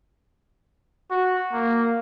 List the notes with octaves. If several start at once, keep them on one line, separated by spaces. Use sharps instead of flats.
F#4
A#3